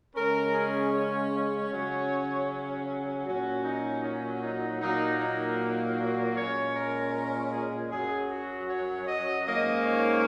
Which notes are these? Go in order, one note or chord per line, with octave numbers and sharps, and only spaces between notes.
C#3 G#3 C#4 A#4
G#4
C#5
C#5
C#3 F#3 C#4
C#5
A#2 F#3 C#4 F#4
D#4
C#4
D#4
A#2 F#3 A#3 D#4
D#4
D#4
F#4
A#2 G#3 C#4 C#5
A#4
A#4
G#4
F#2 F#3 C#4 G#4
F#4
C#5
D#5
G#2 D#3 A#3 C#4 D#5
C#5